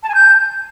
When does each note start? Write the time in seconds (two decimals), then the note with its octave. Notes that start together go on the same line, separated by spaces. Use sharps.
0.03 A5
0.09 G#5
0.15 G6